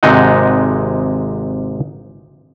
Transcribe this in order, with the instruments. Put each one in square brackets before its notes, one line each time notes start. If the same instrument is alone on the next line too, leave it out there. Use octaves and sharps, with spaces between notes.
[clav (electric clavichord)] G#1 C3 G#3 D#4 D#5 F#5